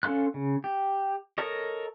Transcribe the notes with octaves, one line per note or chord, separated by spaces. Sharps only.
C#4 A4 F5 C6 F#6
C#3
G4
A4 A#4 C#5 D#5